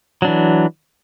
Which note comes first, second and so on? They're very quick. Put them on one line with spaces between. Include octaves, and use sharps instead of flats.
F#3 D4 E3